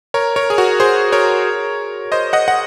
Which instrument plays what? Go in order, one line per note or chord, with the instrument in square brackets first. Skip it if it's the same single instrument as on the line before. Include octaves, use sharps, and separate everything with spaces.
[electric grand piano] A#4 C#5
A#4 C#5
G#4
F#4 A#4
G#4 C5
A#4 C#5
C5 D#5
D#5 F#5
F#5